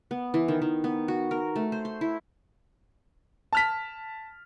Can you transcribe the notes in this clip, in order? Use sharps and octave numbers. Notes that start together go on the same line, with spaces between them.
B3
E3
D#3
D#3
B3
F#4
A#4
A3
C5
C6
E4
A5 F6 B6